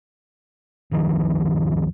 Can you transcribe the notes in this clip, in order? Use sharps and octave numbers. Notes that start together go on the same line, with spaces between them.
G1 C#2 D#3 F3